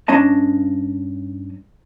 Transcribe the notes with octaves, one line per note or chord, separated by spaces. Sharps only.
G2 C#4 D4 D#5 A5